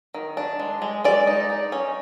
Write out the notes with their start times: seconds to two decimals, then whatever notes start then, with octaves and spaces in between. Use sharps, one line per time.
0.14 D#3
0.37 D4
0.59 G#3
0.82 G#3
1.04 G#3 D5
1.27 D#4
1.50 D#4
1.72 C#4